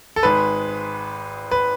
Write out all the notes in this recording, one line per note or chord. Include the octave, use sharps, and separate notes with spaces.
A4
G#1 G#2 G#3 B4
B4